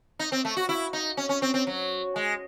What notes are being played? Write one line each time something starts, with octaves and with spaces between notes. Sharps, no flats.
D#4
C4
A3
F#4
E4
D#4
C#4
C#4
C4
C4
F#3
G#3